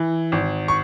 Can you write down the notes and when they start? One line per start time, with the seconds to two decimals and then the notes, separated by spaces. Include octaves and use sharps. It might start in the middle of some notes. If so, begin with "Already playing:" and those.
Already playing: E3
0.32 G#1
0.68 C#6